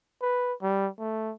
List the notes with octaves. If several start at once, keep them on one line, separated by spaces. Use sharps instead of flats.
B4
G3
A3